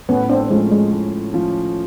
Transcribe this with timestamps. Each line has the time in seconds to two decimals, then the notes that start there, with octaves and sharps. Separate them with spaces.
0.09 A2 B3 C#4
0.29 C4 D4
0.50 F3 G#3 A3 C#4
0.71 G#3
0.92 A2
1.33 F3 A3 C#4